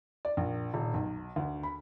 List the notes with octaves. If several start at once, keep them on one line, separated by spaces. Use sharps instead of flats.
D5
A#1
D#1
B1
D2
B5